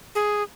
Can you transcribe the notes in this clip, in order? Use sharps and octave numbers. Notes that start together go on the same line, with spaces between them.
G#4